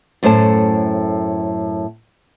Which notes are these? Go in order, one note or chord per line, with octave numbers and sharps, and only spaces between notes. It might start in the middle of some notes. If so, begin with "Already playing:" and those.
F#2 A2 A4 C5 A5